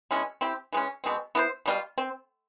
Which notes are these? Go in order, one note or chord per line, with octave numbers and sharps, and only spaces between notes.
B2 G#3 C#4 E4
C4 E4 G4
E3 G#3 C#4
B2 G#3 C4
B3 E4 A4 C5
B2 G3 C4 F4
C4